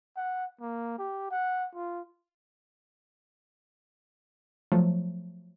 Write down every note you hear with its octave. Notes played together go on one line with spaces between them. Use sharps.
F#5
A#3
G4
F#5
F4
F3 F#3 A3